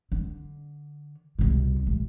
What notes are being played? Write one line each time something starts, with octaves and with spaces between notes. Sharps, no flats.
D3
C2 B2
A1